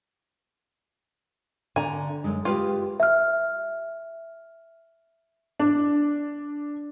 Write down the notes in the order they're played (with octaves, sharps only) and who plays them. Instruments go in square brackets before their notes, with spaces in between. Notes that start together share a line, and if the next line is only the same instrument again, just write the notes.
[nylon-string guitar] D3 [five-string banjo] G#5 A#5
[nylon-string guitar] F#2 G#3
[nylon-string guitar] G#3 G4 [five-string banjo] F4 B4
[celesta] E5 F6
[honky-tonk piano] D4